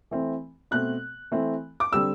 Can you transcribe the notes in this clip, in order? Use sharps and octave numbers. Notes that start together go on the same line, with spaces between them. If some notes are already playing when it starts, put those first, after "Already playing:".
E3 A3 C4
B2 A3 C4 F#6
E3 A3 C4
D6
D3 G3 C4 E6